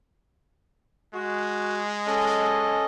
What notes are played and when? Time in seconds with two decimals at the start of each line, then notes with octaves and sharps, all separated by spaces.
1.14 G#3 F#4
2.06 C#4 A4 D#5